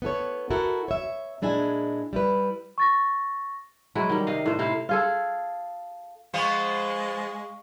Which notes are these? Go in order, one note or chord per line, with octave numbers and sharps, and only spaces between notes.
B3 E4 A4 C#5
E4 F#4 A4 A#4
C#5 E5
A#2 G#3 D4 E4 G#4 G#5
G3 E4 B4
C#6 A6 A#6
F#3 G#3 E4
D#3 G3
C3 D#5 F5
A2 C5
C3 E4 C5 F5
F4 G#4 A4
F3 G#3 B3 C5 F5 C#6